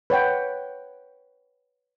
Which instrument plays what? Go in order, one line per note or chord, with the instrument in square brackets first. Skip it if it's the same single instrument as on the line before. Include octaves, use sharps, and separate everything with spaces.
[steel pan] B4 C#5 F#5 G5